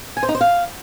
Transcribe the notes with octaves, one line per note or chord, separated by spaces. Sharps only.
G#5
C5
D#4
C5
F5